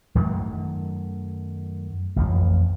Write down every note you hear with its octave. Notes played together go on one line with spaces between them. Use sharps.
F#2 D#3 F#3 A3
A1 F2